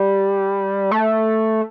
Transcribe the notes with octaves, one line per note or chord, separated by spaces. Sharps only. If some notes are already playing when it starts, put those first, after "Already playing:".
Already playing: G3
A3